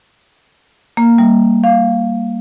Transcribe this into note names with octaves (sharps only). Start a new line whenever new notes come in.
A#3
G3
F5